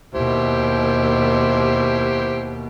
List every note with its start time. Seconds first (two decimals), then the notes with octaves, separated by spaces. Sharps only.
0.15 D#2 B2 E4 G4 C5